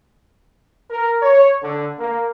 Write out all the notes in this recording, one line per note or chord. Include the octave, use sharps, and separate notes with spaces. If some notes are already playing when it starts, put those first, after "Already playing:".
A#4
C#5
D3
A#3